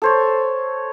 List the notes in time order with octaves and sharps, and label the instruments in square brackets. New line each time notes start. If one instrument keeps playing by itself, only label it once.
[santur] A4 C5 C#5